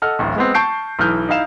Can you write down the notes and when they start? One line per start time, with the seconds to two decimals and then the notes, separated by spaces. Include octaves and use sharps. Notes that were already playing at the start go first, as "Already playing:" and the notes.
0.02 A4 D#5 F#5 F6
0.19 D1 A1
0.36 G#3 B3 C4
0.54 A5 C#6 G6 C7 D7
0.99 B1 E3 F6 G6
1.29 D#4 E4 F5 E7